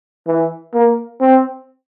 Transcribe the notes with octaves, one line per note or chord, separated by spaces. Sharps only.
E3
A#3
C4